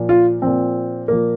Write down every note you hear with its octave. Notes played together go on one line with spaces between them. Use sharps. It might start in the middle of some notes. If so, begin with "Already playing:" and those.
Already playing: A#2 F3
F4
A#2 F3 C4
A#2 F3 A#3